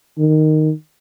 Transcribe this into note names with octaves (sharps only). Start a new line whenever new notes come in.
D#3